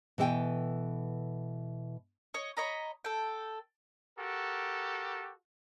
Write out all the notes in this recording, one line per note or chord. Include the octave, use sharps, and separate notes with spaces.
B2 E3 A4 B4 G5 G#5
C#5 D#5
C#5 D#5 A#5 B5
A4 G5
F#4 G4 A4 A#4